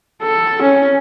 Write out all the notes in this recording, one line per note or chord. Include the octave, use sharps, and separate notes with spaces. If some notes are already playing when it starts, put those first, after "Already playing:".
A4
C#4